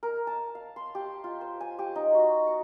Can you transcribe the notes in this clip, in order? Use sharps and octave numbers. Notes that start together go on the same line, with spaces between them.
A#4
A5
F5
C6
G4
F4
C5
G#5
G4
D#4
F#4
C#6